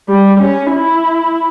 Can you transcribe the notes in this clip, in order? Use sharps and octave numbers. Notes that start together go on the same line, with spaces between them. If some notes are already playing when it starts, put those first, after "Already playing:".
G3
C#4
E4